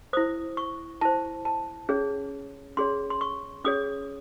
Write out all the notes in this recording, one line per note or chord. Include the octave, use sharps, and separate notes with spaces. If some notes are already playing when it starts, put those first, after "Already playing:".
E4 C5 D#6
C#6
E4 C5 A5
A5
C#4 G#4 C#5
C#4 G#4 C#5 C6
C6
C#6
C#4 G#4 C#5 D#6